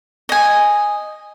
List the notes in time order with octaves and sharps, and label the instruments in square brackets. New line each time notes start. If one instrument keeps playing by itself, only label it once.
[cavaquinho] D#5 G#5